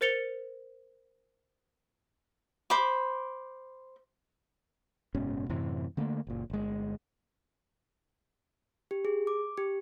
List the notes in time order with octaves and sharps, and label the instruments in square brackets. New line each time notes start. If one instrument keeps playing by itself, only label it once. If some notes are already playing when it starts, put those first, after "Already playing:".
[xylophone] A#4 C5 A6 C#7 F7 G7
[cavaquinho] C5 B5 D6
[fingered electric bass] F#1 G#2 B2 C#4
F#2 A2 C3 E3
D3 A3 A#3
F#1 A#2
G1 G#3
[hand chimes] G4
G#4
D6
G4